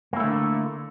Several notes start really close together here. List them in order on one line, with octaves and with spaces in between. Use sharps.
A#3 E4 A3 D3